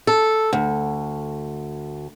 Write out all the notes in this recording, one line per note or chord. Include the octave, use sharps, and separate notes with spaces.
A4
D2